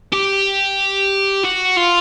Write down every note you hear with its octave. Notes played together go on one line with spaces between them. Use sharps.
G4
F#4
F4